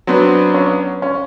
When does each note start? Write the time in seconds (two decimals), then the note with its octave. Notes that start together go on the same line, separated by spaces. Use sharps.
0.07 F#3 B3 C4 D4
0.54 C#4
1.02 C#4